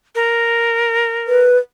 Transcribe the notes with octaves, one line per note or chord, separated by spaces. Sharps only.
A#4
B4